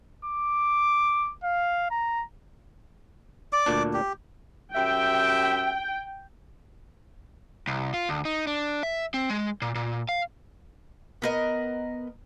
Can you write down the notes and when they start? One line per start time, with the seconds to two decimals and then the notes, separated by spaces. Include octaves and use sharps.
0.25 D6
1.44 F5
1.91 A#5
3.53 D5 D6
3.66 D2 A#2 D4
3.93 G4
4.74 F#2 G4 E5 G5
7.67 C2
7.94 F4
8.09 D2
8.25 D#4
8.47 D4
8.83 E5
9.14 C4
9.30 G#3
9.62 A#2
9.75 A#2
10.09 F5
11.22 B3 A#4 D#5